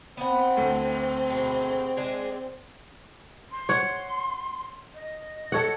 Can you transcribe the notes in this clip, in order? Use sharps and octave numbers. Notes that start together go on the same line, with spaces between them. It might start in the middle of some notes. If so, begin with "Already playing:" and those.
B3 C4 F#5
D2 A3
B2 G4 G#4
G#3 D4 G#4
C6
C#5 F#5
D#5
A4 C#5 F#5